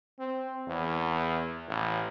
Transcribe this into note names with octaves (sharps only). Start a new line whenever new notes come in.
C4
E2
A1